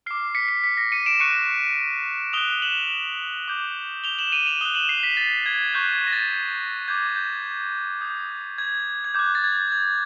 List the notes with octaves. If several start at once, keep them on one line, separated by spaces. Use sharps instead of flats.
D6 F6 C7
B6 C#7
C7
B6
A#6
C#7 D#7
D7 E7
C#6 F#6 C#7 D#7
D#6 F#6 F7 G7
E7 F#7
D6 G6
F7 G7
E7 F#7
D#7 F7
D#7 F7
D#6 F#6 F7 G7
E7 F#7
C7
B6
A6
G#6
C#6 F#6 G6
G#6
A#6
A6
D6 G6 G#6
G6
D#6 G6
G#6
G#6
D6 F#6 G6
A6
G#6
G#6